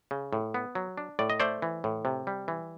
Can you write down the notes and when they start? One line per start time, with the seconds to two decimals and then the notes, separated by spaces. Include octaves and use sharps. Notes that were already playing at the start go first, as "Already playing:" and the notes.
0.11 C#3
0.33 A2
0.54 B3
0.75 F#3
0.98 D4
1.19 A2 D5
1.30 D#5
1.40 A3 C5 D5
1.62 E3
1.84 A2
2.05 C3
2.27 G3
2.48 E3